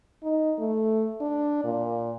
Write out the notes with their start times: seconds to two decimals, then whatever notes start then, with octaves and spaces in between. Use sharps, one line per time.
0.23 D#4
0.59 A3
1.21 D4
1.64 A#2